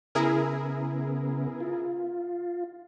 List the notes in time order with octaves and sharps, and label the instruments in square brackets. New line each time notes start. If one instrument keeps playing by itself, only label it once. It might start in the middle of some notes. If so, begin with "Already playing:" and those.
[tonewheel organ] C#3 B3 [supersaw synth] E4 G#4 A#4
[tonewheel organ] F4